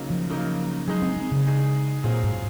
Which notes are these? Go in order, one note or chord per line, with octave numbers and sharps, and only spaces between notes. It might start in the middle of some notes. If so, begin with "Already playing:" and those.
Already playing: C#3 F#3 A#3 D#4
F3
C#3 F#3 A#3 D#4
F#3 G#3 D#4 G#4
C4
C4
C#3
G#3 D#4 G#4
A#2 F#3 C4 F4 G#4
G#2